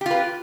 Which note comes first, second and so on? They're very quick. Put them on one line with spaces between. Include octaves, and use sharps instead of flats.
G4 F4 B4